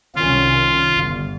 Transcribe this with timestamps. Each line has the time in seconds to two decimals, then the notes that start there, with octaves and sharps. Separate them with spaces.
0.16 C2 D#3 C#4 F4
0.93 G1